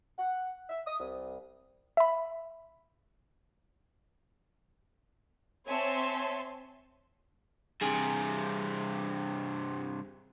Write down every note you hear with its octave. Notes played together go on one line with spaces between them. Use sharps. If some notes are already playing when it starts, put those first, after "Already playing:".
F#5
E5
D#6
C2
E5 B5
C4 C#5 E5 G#5 A5 C6
G2 C3 G#4